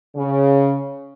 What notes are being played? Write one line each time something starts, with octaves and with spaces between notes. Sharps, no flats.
C#3